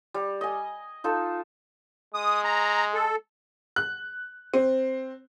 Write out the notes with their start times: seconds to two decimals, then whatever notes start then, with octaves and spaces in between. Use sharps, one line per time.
0.14 G3
0.41 D#5 G#5
1.04 D#4 F4 A4
2.14 G#3 D#6
2.44 A#5
2.94 A4
3.76 F#6
4.54 C4